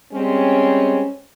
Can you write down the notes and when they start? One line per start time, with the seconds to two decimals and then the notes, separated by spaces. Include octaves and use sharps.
0.13 G3 G#3 C4 C#4